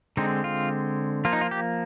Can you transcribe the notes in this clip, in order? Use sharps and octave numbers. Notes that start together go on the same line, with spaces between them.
D3 G#3 C4 D#4
F4
F3 A#3 F4
D#4
F4
G4